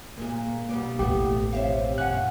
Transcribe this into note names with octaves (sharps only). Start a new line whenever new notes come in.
A#2 G#3 A#3
B1 G3 B3 D4
A1 D#2 A2 A3 B3 G4
B2 C4 C#5 E5 F5
F#1 A#2 C#4 F#5 F#6